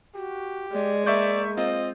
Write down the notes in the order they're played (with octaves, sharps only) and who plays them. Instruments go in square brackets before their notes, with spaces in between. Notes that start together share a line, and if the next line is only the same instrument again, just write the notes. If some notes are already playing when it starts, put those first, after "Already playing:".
[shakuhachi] F#4 [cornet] G4
[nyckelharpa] G#3 [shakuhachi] D5
[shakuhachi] A#3 [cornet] D5 [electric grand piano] E5 C#6 G6
[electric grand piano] C4 F4 [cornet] D#5